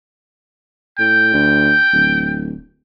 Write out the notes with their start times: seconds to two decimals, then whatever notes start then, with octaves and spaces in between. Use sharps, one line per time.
0.99 A2 G5
1.33 D2
1.93 D1